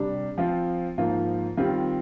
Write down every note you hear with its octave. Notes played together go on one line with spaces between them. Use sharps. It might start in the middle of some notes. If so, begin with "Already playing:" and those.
Already playing: C3 G3 D4 G4
F3 C4 F4
G#2 F3 A#3 F4
D#3 G3 C4 F4